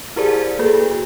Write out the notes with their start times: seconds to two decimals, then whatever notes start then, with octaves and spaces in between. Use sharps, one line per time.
0.16 E4 G4 G#4 A#4 C5 D5
0.59 A#3 F#4 G#4 A4 B4